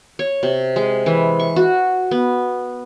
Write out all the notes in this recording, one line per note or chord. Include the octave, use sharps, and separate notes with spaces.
C#5
C3
G#3
E3
C#6
F#4
B3